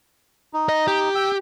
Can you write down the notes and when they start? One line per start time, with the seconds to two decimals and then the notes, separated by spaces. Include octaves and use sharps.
0.53 D#4
0.69 D#5
0.87 G4
1.15 G5 E6